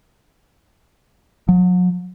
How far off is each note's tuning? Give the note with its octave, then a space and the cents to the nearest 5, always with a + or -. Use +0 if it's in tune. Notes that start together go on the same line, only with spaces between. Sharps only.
F#3 -40